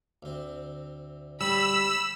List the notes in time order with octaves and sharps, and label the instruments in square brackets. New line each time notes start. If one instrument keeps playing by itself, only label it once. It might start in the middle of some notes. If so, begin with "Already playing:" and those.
[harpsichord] D2 C4
[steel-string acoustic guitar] G3 [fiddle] B5 [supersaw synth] E6